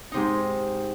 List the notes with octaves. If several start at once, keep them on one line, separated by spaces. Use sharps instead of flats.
G#2 C3 D#4